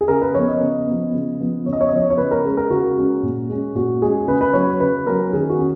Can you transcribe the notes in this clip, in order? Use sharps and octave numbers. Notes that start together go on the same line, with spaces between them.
G#4
C#3 A#4
B4
F3 B3 C#5
D#5
C#3
F3 B3
C#3
F3 B3
C#3 C#5
D#5
C#5
D#5
F3 B3 C#5
C#5
C#3 B4
A#4
G#3 C#4
A#4
C#3 F#4
G#3 C#4
A#2
G#3 C#4
A#2 F#4
G#3 C#4 G#4
C#3 B4
B4
F#3 C#4 C#5
C#3 B4
F#3 C#4 A#4
D#3 G#4
F#4
C#4